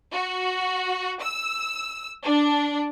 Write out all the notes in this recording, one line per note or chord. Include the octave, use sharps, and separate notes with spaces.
F#4
E6
D4